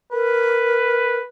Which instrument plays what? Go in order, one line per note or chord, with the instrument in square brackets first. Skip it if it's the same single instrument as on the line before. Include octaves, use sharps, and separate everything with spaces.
[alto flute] A#4 [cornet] B4